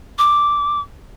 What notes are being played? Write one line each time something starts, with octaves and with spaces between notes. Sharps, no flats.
D6